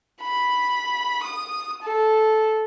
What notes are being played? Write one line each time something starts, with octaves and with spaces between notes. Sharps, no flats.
B5
D#6
A4